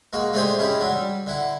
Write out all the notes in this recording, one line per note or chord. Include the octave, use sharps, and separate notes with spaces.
G#3 A#3 F#4
G#3 A3 D4 G4 C5 G#5
G#3 C#4 E4 G4
F#3 D4
G3
D3 E4 F#5